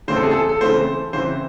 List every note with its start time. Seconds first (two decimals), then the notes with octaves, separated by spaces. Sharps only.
0.08 C#3 E3 A3 C4 C5
0.16 A4
0.23 G#4
0.31 A4
0.49 A4
0.61 C#3 E3 A3 C4 C5
1.13 C#3 E3 C4 C5